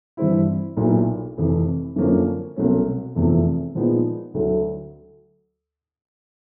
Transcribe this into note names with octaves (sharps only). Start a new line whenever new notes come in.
G2 E3 G3 C4 E4
B1 A#2 F#3 B3 E4
F1 F2 C3 E3
F#2 D3 F3 A#3 C#4
C2 B2 F#3 A3 C#4
F1 E2 C3 F3 A3
A#2 F3 G#3 B3 D#4
D2 D3 F#3 A3